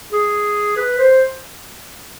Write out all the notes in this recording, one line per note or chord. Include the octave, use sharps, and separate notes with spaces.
G#4
B4
C5